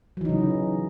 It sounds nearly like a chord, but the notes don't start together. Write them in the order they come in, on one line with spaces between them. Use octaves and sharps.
F#3 E3 D#4 C#3